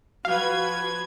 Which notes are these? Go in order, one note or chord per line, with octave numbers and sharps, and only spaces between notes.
F3 F#4 B4 F5 G#6